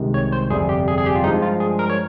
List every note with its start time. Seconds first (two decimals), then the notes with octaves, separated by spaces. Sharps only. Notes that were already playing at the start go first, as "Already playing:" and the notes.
Already playing: C2 C3 D#3 G#3
0.14 C#5
0.32 C5
0.50 G1 F2 C3 G3 G#4
0.69 G4
0.88 G#4
0.98 G#4
1.06 G4
1.15 F4
1.24 G2 F3 G#3 D#4
1.42 F4
1.60 G#4
1.79 A#4
1.89 C#5